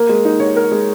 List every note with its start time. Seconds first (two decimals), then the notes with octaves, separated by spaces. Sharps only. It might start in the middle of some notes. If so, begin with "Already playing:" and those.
Already playing: A#3 A#4
0.09 G#3
0.25 D#4
0.40 C#5
0.56 A#4
0.71 G#3